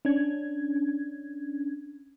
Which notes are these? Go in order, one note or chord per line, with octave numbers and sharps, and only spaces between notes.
C#4 D4 G#6